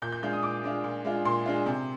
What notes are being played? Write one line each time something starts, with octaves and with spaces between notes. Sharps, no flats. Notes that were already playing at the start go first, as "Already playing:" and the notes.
A#2 G6
G6
G#3 D4 F4 G6
D#6
A#2 D6
G#3 D4 F4
A#2
G#3 D4 F4
A#2 C6
G#3 D4 F4
C3